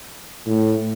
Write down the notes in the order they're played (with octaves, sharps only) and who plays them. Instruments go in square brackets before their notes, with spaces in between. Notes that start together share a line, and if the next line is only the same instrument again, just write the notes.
[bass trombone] A2